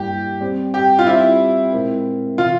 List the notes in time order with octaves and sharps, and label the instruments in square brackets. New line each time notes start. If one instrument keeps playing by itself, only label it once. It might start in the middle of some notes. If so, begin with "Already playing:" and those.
Already playing: [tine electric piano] G2 G3 A#3 E4 [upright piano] G4
[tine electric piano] G3 C4 G4
[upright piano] G4
F4
[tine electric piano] G3 C4 G4 [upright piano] E4
[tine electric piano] A#2 G#3 C4 E4 A#4
[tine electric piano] C3 E3 [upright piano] F4